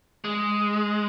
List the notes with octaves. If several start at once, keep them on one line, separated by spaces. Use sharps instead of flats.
G#3